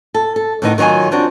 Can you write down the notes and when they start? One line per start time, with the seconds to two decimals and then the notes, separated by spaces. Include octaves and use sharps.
0.14 A4
0.36 A4
0.62 A2 D#3 E3 B3 D#4
0.78 D#3 F#3 D#4 F4 G#5
1.11 F3 C4 D4 F#4